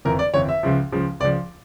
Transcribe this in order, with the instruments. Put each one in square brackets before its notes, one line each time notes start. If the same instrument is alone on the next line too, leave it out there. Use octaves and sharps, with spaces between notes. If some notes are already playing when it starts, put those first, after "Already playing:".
[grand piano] G1 F2 E3 A#4
D5
G1 F2 E3 C#5
E5
C#2 C#3 F3
C#2 C#3 F3
C#2 C#3 F3 D5